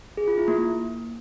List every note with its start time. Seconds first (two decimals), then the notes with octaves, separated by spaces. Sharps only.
0.17 G#4
0.28 F4
0.38 E4
0.48 A#3
0.58 A#3